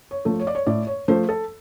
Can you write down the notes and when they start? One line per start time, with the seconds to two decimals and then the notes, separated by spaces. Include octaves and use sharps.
0.11 C#5
0.25 F3 A3
0.39 C#5
0.47 D5
0.55 C#5
0.66 A2 D5
0.87 C#5
1.08 F3 A3 C5
1.29 A4